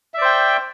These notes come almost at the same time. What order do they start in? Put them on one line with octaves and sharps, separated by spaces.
E5 D5 C5 G5